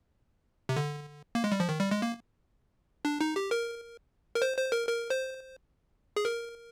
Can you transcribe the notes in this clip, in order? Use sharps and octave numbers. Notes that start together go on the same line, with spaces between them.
C3
D3
A#3
G#3
G3
F3
D#3
G3
G#3
A#3
D4
D#4
G4
A#4
A#4
C5
C5
A#4
A#4
C5
G#4
A#4